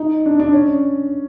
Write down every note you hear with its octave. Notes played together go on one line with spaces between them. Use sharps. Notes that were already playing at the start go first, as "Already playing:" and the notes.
Already playing: D#4
D4
D4
C#4